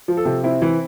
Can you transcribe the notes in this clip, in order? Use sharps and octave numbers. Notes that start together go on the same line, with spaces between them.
F3
A4
C3
C4 E4
E3